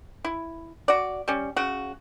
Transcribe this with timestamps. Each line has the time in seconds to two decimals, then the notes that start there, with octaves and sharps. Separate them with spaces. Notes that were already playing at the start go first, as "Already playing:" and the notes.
0.24 E4
0.88 F#4 D5
1.28 G3 C#4
1.56 C#3 F#4